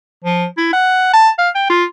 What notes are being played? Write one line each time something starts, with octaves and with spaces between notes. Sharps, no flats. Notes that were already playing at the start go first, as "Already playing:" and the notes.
F3
E4
F#5
A5
F5
G5
F4